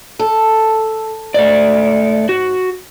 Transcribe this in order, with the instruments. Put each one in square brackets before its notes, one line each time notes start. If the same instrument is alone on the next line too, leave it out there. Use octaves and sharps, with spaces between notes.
[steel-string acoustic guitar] A4
[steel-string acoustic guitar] G#2 [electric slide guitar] A3 D5
[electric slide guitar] F#4